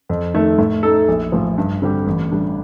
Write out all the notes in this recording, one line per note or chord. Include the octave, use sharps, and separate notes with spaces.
F2
D#3 A3
A2
A3 D#4 A4
A#1
A2 F3
G2
D3 G3 C4 G4
A1
A2 G3 D4 G4